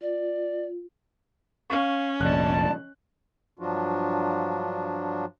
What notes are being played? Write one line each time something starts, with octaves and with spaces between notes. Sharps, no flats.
F4 D5
C#4 F5 C#6
F1 A#1 D5 D#5 A5 F#6
G2 F3 F#3 D4 F4 F#4